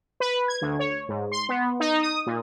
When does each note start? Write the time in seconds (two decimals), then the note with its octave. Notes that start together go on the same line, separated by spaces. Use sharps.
0.20 B4
0.48 G#6
0.61 D2
0.79 C#5
1.08 G#2
1.32 C6
1.49 B3
1.80 D#4
2.02 D#6
2.26 A#2